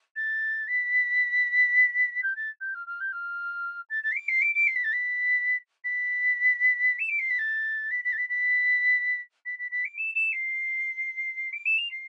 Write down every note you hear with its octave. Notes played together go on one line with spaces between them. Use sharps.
A6
B6
G6
A6
G6
F6
F6
G6
F6
A6
A6
C7
D7
C7
D7
D7
C7
B6
A6
B6
B6
E7
D7
C7
B6
A6
B6
B6
A6
B6
B6
B6
B6
B6
D7
E7
E7
C7
D7
E7
F7
C7